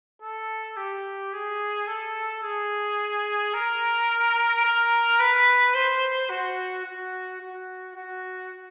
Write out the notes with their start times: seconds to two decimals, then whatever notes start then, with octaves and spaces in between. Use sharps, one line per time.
0.22 A4
0.77 G4
1.33 G#4
1.87 A4
2.43 G#4
3.54 A#4
4.64 A#4
5.20 B4
5.75 C5
6.30 F#4
6.85 F#4
7.41 F#4
7.95 F#4